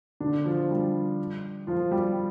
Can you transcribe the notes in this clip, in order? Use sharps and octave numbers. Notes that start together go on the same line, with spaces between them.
D3 D4
F3 F4
G3 G4
F3 F4
G3 G4